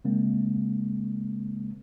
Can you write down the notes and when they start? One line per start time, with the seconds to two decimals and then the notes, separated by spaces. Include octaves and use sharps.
0.05 C#3 G#3 A#3 C4